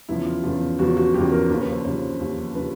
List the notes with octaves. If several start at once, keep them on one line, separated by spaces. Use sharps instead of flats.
E2 C#3 F3 E4
F4
E2 C#3 F3
E2 C#3 F3 F#4
F#4
E2 C#3 F3 G4
A#4
D#2 C#3 F3 B4
B4
C5
D#2 C#3 F3 C5
D#2 C#3 F3
C#3 F3 B4